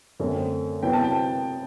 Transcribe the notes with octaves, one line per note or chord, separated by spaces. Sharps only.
F#2 D3 A3 C4
C3 F#3 B3 E4 G5
A5
G5